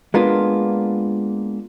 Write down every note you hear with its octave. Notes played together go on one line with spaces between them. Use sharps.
G#3 A#3 B3 D4 F4